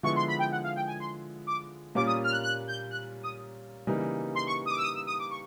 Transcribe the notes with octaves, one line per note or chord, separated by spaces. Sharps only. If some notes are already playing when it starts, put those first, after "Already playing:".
D3 F3 G#3 B3 E4 C#6
C6
B5
G5
F#5
F5
G5
G#5
C6
D6
A#2 G3 A#3 C#4 F4 D6
D#6
F6
F#6
F#6
G6
F#6
D#6
C#3 E3 G3 A#3 D#4
C6
C#6
D#6
D6
E6
D#6
E6
D#6
D6
C#6